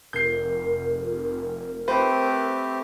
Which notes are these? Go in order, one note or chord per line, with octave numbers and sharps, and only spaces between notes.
F1 A#4 G6 C7
A3 C4 G4 B4 C5